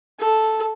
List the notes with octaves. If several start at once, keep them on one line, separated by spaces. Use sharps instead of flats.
A4